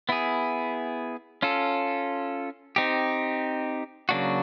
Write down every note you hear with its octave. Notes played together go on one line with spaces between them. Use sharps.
B3 E4 G#4
C#4 F4 A4
C4 D#4 G4
C#3 F#3 A#3 D4 F#4